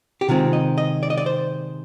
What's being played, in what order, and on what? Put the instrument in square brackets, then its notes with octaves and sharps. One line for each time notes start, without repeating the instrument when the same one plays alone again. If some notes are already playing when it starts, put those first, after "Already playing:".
[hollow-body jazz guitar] G4
C3 D#3 G#3 C4 F4
D#5
D#5
D5
D#5
D5
C5